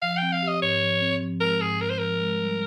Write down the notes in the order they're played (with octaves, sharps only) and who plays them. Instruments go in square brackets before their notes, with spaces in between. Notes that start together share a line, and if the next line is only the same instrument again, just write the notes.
[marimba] F3 [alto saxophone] F5
[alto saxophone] G5
[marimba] C4
[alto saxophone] F5
[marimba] G4
[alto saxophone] D#5
[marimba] G#2 [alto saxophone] C#5
[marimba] F3
C4
F3
[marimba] G#3 [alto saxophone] A#4
[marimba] G#2 [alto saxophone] G#4
[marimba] G#2 [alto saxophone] A#4
[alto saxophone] C5
[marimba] F3 [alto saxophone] A#4
[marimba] G#3
G3